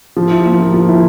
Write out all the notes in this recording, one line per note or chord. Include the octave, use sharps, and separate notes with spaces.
F3
E4
A#3
F3
F3
E4